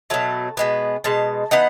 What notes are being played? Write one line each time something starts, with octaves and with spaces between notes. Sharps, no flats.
B2 F#3 A3 A5
B2 G#3 B3
B2 G#3 A5
E3 B3 D#4 F#5